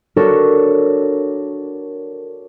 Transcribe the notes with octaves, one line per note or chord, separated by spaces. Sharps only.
D4 F#4 A4 A#4 C#5